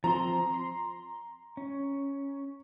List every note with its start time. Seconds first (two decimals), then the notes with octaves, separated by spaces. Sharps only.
0.04 F3 C4 A#5 C6
0.54 C6
1.57 C#4